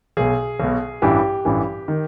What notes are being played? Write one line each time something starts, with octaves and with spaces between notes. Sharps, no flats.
B1 B2 G#4
B1 B2
A1 G2 E3 G4
A1 G2 E3
D#3